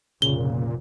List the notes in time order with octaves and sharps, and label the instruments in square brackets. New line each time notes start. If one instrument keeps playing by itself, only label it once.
[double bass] F1 [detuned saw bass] A#2 [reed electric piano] C#3 [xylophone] G7